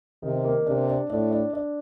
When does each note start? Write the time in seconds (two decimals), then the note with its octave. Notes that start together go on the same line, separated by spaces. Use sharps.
0.23 C3 D#3
0.45 A#3
0.66 C3 D4
0.88 D4
1.10 A2 D4
1.32 D4
1.53 D4